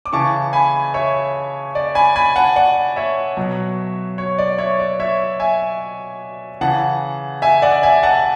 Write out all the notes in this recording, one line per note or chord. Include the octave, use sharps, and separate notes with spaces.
D6
C#3 E3 A5 C#6
G#5 B5
C#5 E5
D5
G#5 B5
G#5 B5
F#5 A5
D5 F#5
C#5 E5
B2 F#3
C#5
D5
C#5 E5
D5
C#5 E5
E5 G#5
C#3 E3 F#5 A5
E5 G#5
D5 F#5
E5 G#5
F#5 A5